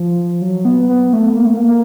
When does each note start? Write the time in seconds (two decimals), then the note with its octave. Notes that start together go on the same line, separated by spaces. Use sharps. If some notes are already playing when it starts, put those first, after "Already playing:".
Already playing: F3
0.42 F#3
0.65 B3
0.89 B3
1.13 A3
1.37 A#3
1.47 A3
1.57 A#3
1.67 A#3